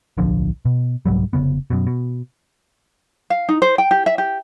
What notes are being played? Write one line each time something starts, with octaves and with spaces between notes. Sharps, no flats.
D1 B1 D3 F3
B2
C2 G#2 F#3 G3
F1 F2 C#3 B3
F#2 B2
B2
F5
D#4
C5
G5
G4
E5
G4